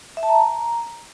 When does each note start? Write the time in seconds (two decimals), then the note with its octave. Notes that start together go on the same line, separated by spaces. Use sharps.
0.17 E5
0.23 A5
0.29 A#5